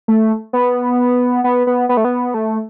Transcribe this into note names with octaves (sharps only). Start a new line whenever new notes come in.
A3
B3
B3
B3
B3
A3
B3
A3